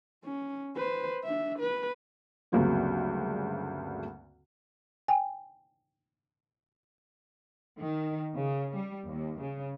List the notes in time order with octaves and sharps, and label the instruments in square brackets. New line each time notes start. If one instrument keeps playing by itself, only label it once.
[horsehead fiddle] C#4
B4 C5
D4 E5
B4
[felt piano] D2 G2 C#3 F#3 A#3 C4
[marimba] G5 G#5
[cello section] D#3
C#3
G3
D#2
C#3